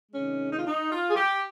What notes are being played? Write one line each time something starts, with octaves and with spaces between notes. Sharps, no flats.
C3 D#3 G#3 C#4
D#4
F4
D#4
F4
G#4
G4